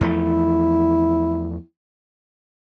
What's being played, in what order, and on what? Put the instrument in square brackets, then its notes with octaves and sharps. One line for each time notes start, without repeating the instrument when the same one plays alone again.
[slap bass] E2 F3 A3 [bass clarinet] E4